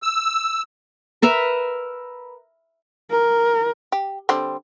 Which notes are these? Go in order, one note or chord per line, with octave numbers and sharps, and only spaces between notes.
E6
A#4 B4 E5 A#5
A#4
G4
D3 G3 C4